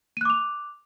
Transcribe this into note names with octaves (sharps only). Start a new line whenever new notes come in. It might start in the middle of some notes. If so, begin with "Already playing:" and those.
D6 F#6 D#7 F7